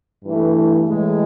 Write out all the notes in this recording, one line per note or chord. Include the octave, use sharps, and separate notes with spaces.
G2 E3 A3
A2 E3 G#3